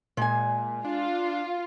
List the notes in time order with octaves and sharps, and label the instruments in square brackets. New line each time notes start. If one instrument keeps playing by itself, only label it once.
[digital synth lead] A#2 [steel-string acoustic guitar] G#3 G#5
[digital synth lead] D4 [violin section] F4